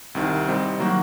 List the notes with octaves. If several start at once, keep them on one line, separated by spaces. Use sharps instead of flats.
C2 C3 D#3
C3 G3 C4 D#4
D#3 F#3 A#3 F#4